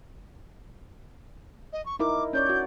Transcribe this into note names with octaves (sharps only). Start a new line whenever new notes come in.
D#5
C#6
D#4 E4 A#4 D6
C#4 C#5 D5 G6
F#4